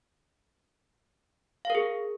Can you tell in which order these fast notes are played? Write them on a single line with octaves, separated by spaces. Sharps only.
F5 A#4 G#4